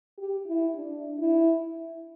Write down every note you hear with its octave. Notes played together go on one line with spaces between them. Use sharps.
G4
E4
D4
E4